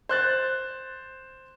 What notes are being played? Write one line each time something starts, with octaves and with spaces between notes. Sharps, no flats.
C5 F#6 A6